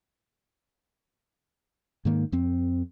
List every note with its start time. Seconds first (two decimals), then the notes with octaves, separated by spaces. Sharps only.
2.05 G#2 D#3 A#3
2.32 F2 C4